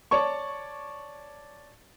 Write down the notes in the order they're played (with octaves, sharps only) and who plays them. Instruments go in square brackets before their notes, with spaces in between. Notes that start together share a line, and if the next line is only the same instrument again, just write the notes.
[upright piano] C#5 D5 A5 C#6